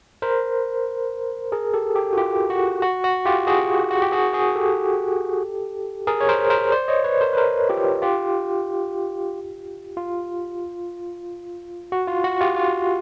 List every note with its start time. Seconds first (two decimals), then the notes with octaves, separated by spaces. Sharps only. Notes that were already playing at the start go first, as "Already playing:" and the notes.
0.22 A#4 C5
1.52 G#4 A#4
1.74 G4 A4
1.95 G4 A4
2.13 F#4
2.17 F4 G4
2.50 F#4
2.82 F#4
3.04 F#4
3.26 F4 G4
3.47 F#4 G#4
3.91 F#4
4.02 G4
4.12 F#4 G#4
4.33 F#4 G#4
4.55 G4 A4
6.07 G#4 A#4
6.21 C#5
6.29 A#4 C5
6.50 A#4 C5
6.72 C5 D5
6.88 C#5 D#5
7.04 B4 C#5
7.21 A#4 C5
7.33 B4
7.37 A#4 C5
7.69 F4 G4
8.02 F4 G4
9.97 F4
11.92 F#4
12.07 F4
12.24 F#4
12.41 F4 G4
12.56 F4